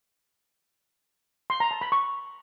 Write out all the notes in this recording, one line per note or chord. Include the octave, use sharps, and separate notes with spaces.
C6
A#5
A5
B5
C#6